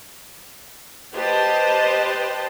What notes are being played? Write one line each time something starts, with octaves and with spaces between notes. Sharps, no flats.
G4 B4 C5 D#5 A5